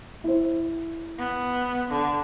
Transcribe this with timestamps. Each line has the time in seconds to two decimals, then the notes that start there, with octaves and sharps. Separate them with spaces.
0.24 E4 C5
1.18 B3
1.90 D3